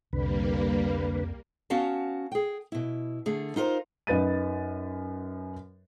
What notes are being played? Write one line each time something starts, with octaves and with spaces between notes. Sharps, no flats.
C2 F2 D3 G3 A#3 B4
B3 C#4 F#4 F5 A5
G#4 G5
B2 E4
D3 A3 G#4
D#4 F4 A#4 C5
F#2 D#4 B4 A6 D#7